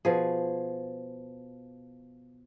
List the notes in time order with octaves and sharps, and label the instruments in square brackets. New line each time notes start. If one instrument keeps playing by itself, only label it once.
[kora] B2 F3 G#4